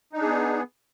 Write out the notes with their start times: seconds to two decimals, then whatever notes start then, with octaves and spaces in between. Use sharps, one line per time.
0.13 D#4
0.17 D4
0.21 G#4
0.26 B3